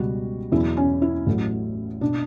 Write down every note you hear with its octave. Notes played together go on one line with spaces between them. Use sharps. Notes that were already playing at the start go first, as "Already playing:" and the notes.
Already playing: C#2 B2 G3 F#4
E2 B2 F#3 E4
C#4
E4
A1 A2 F#3
B2 D4